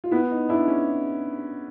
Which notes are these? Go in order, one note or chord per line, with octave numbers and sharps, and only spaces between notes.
F4
B3 E4
D#4
D4 E4
C#4